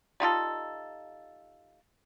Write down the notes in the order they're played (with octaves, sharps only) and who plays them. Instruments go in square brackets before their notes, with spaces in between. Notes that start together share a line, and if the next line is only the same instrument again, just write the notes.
[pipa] G3 D#4 F4 A4